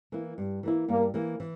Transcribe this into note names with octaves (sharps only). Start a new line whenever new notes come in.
E3 A#3 E4
G2
E3 A#3 E4
G2 A#3
E3 A#3 E4
E3